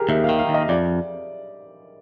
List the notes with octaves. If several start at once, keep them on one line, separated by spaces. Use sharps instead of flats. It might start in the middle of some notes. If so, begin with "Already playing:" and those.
Already playing: G4 G#4 A#4
D#2 E5
F5
D#3
F5
D#2
D#5
F2 D5